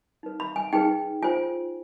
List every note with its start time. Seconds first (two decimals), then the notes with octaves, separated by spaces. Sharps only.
0.23 D#4 B4
0.40 B5
0.56 G#5
0.73 D#4 G#4 B4 G5
1.22 F4 C5 G#5